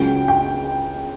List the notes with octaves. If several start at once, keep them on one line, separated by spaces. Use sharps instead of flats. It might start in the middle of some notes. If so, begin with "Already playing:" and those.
Already playing: C#2 C#3 F#3 G5
G5